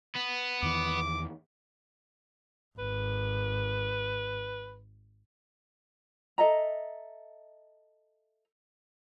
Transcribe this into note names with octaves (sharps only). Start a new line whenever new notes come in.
B3
E2 D#3 E3 D6
G#1 B4
A4 D#5 E5 A#5